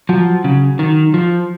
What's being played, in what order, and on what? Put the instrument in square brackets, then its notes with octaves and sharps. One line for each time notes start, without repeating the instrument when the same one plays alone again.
[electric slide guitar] F3 [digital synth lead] F#3
[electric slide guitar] C#3
D#3
F3